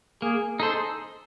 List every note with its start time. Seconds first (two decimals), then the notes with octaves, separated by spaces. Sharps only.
0.22 A#3 G#4
0.60 D#4 G#4 A4 C5